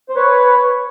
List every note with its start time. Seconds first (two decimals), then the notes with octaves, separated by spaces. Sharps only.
0.09 C5
0.15 B4 C#5